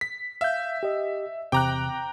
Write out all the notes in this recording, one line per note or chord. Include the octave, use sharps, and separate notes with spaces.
B6
E5 F5 G6
G4 D#5
E2 C3 G5 A#5 D6 F#6